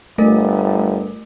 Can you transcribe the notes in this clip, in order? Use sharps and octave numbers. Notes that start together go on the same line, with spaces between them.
G1 A3 A#4